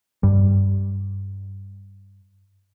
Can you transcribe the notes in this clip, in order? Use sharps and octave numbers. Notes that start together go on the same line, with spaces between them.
G2 G3